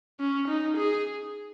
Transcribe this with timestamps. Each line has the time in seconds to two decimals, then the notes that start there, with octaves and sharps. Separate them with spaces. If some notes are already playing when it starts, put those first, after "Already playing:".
0.20 C#4
0.48 D#4
0.77 G#4